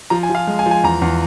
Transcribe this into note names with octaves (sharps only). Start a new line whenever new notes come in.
F3 A#5
G#5
F3 F5
G#3
G#5
F3
G#5
E2 A#5
E2